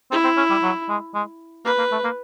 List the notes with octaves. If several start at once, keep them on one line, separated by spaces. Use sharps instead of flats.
C4 E4
C4
C#4
G3
F#3
G#3
G#3
A#3 B4
A#3
A3
A#3